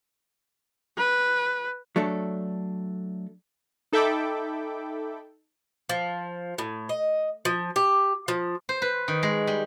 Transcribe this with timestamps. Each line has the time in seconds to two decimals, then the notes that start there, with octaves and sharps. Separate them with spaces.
0.98 B4
1.96 F#3 A3 D4 A4
3.93 D#4 A4 E5 G5 B5 D6
5.89 F3
6.58 A2
6.89 D#5
7.45 F3
7.76 G4
8.28 F3
8.69 C5
8.82 B4
9.08 D#3
9.23 G#3
9.47 G3